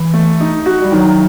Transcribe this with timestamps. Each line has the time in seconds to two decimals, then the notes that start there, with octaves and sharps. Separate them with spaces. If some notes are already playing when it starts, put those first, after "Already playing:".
Already playing: E3
0.14 A3
0.40 D#4
0.66 F#4
0.81 G3
0.92 D#3 F#3